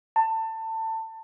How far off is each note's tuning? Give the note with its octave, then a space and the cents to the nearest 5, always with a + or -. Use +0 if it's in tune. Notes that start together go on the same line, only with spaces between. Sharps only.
A5 +25